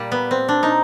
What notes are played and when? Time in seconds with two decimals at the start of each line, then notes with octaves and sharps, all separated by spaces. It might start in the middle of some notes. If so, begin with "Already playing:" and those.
Already playing: A#2 G3
0.12 B3
0.31 C4
0.49 D4
0.63 D#4